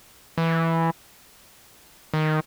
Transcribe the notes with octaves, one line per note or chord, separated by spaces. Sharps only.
E3
D#3